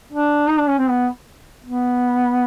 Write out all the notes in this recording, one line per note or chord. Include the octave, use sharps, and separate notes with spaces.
D4
D#4
D4
C#4
C4
B3
B3